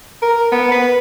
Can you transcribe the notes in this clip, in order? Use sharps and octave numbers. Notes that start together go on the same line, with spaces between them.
A#4
B3
B4